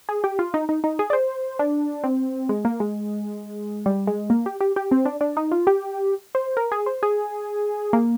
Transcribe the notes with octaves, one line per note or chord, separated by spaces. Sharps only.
G#4
G4
F4
D#4
D#4
D#4
G#4
D5
C5
D4
C4
G#3
A#3
G#3
G3
G#3
A#3
G4
G4
G4
C4
D4
D4
D#4
F4
G4
C5
A#4
G#4
C5
G#4
A#3